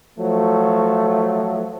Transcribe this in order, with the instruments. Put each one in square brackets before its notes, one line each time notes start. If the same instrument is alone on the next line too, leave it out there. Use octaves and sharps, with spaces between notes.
[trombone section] F3 F#3 A3